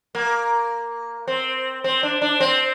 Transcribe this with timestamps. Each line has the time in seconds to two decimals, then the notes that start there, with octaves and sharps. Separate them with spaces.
0.15 A#3
1.28 C4
1.84 C4
2.03 D4
2.22 D4
2.40 C4